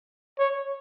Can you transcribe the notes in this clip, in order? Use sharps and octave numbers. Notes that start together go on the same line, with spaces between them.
C#5